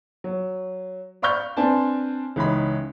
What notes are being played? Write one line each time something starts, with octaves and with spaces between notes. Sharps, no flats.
F#3
D5 F5 B5 C#6 F6 G6
C4 D4 B4 G#5 A5
C#2 E3 C#4 D#4 B5